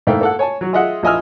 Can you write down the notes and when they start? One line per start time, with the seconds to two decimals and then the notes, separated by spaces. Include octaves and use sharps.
0.07 G#2 A3 A#3 E4 F5 G5
0.21 A#3 A4 F#5
0.39 C#5 G#5 A5
0.61 F#3 F#4
0.73 F4 G#4 D#5 E5 F#5
1.03 A#1 E4 D#5 G#5 E6 F6